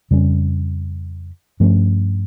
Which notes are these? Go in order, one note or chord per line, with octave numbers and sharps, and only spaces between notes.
F2 C#3 G3 C#4
G2 F3 A3 C#4